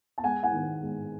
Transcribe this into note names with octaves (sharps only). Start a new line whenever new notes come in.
A5
G#3 F#5 G#5
F#5 G#5
D#3
G#3